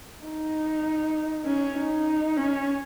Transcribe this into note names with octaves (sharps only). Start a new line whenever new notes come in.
D#4
C#4
D#4
C#4